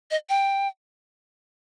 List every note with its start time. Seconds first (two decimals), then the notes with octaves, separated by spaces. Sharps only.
0.11 D#5
0.29 G5